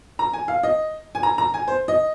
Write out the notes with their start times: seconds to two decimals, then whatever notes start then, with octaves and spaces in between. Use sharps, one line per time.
0.19 A#5
0.33 G#5
0.48 F5
0.63 D#5
1.15 G#5
1.23 A#5
1.38 A#5
1.54 G#5
1.68 C5
1.88 D#5